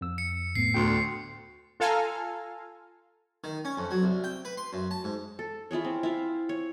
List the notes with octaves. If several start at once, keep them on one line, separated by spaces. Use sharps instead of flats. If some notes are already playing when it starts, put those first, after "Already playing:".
F2 E6
C#7
A2 A3 B3 C7
D2 G5 C6
F4 A4 F5 G#5 A#5
D#3
C#4
F2
F#3
C2
G5
B4
C6
F#2
A5
G#2
A4
E4 F4 G#4 C#5
C4
E4 F4 F5
C#5